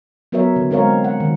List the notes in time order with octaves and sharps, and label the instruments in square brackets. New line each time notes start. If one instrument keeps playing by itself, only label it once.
[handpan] F#3 B3 F#4 A#4 C#5 E5
D3
G#3 C4 A#4 C#5 F5
F#5
D#3